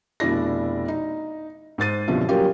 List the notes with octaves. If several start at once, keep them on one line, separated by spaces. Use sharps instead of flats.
F1 B2 D4 E4 D5 A#6
D#4
G#2 C5 A6 D#7
C2 F#2 B2 D3 F3
F#3 G3 A#3 C#4 F4 G4